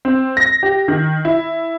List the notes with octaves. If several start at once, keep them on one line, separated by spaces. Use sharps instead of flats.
C4
A#6
G4
D#3
E4